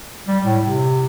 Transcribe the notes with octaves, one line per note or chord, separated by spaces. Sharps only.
G3
A2
C3